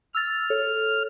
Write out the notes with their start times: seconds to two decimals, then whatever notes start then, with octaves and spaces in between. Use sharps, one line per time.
0.15 E6 F6 A6
0.50 A4 C#5